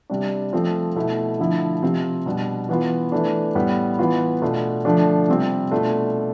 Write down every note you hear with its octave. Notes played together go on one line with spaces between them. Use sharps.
C3 G3 D4
F3 A3 C4 F4
B2 A3 E4
D3 F3 A3 E4
C3 F3 C4 F4
B2 G3 D4
E3 B3 F4
E3 A3 D4
A2 G3 B3
E3 B3 F4
B2 A3 D4 F4
D3 F3 A3 D4
C3 G3 C4 F4
B2 A3 D4 F4